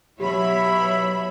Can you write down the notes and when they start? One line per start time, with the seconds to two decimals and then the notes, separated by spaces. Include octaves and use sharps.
0.20 B2 F#3 E4 G4 C#5 E5 B5